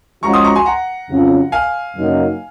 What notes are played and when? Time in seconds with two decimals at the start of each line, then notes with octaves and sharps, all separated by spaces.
0.23 F3 G#3 C#4 F#4 A#5 C#6
0.33 C6 D#6
0.44 A#5 C#6
0.55 G#5 C6
0.66 F#5 A#5
1.10 F2 C#3 F#3 C#4 F4
1.52 F5 G#5
1.96 F#2 C#3 F#3 A#3 D#4